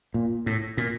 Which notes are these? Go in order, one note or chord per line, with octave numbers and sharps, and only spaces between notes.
A#2
A2
A#2